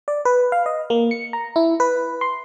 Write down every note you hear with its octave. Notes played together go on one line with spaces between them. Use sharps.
D5
B4
F5
D#5
A#3
C#7
A#5
E4
B4
C6